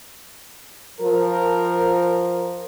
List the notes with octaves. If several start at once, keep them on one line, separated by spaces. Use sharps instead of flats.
F3 A#4